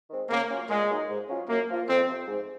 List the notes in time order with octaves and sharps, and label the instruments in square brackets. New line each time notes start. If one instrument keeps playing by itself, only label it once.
[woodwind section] D#3 G#3 C4
[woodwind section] C#3 [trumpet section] A#3
[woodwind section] F#3 C#4 F4
[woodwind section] A#2 [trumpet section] G#3
[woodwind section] F#3 A#3 D#4
G#2
F#3 C#4 F4
[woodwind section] F#2 [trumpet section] A#3
[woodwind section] F3 A#3 F4
[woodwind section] F2 [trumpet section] C4
[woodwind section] C3 F3 C4
G#2